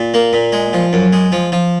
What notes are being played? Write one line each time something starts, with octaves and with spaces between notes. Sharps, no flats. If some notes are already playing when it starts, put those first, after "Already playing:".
Already playing: A#2
A#3
A#2
G#3
F3
F#2
G#3
F3
F3